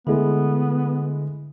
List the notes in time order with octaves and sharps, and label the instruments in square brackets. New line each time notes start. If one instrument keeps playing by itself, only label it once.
[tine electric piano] D3 [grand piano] G#3 A3 E4 [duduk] B3